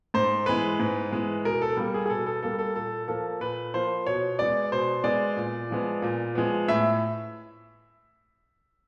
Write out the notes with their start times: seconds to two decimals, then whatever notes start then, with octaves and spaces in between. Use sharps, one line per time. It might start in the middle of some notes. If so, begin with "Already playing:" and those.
0.14 G#2 C5
0.46 E3 G#3 B3 B4
0.80 G#2
1.11 E3 G#3 B3
1.44 B2 A#4
1.62 A4
1.77 G3 A#3
1.94 G#4
2.06 G#4
2.10 B2 A4
2.26 A4
2.43 G3 A#3 A4
2.59 A4
2.76 A#2 A4
3.08 F3 A#3 A4
3.40 A#2 B4
3.74 F3 A#3 C5
4.06 B2 C#5
4.39 G#3 B3 D5
4.72 B2 C5
5.04 G#3 B3 D5
5.36 A#2
5.70 F3 G#3 B3
6.02 A#2
6.35 F3 G#3 B3
6.68 A2 E5